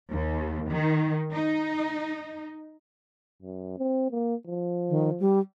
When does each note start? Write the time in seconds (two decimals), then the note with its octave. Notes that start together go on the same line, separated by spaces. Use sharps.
0.11 D#2
0.70 D#3
1.32 D#4
3.42 F#2
3.78 C4
4.11 A#3
4.47 F3
4.89 D#3
5.20 G3